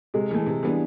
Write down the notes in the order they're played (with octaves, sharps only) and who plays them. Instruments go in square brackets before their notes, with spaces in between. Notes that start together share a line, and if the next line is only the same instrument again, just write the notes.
[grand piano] C3 [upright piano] G#3
[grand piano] E3 A3
C3
E3 G3 B3 D4